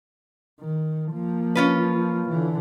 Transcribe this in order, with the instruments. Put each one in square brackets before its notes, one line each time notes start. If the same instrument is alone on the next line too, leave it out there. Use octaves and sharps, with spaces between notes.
[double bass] D#3
F3 A#3
[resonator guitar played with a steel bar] C#4 F4 B4
[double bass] D3 E3